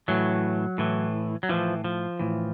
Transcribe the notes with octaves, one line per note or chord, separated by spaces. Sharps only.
A2 E3 F#3
A2 E3
F#3
A2 E3 F3
F3
A2 E3